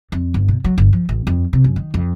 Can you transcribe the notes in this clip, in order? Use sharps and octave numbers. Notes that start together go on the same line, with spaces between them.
F2
G1
B2
F#3
G1
F3
A1
F2
C3
F#2
D#3
F2